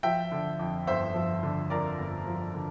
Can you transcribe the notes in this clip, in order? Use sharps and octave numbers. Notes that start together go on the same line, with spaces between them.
F3 E5 G5
D3
F2
G1 C5 E5
F3
D3
F2 A#4 D5
G1
F3
D3